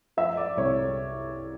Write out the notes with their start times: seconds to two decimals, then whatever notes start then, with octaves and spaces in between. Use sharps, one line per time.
0.17 F3 E5
0.37 D5
0.57 C2 C#5